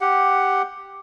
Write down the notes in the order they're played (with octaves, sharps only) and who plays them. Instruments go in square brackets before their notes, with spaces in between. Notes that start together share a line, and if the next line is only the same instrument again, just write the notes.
[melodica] G4 F#5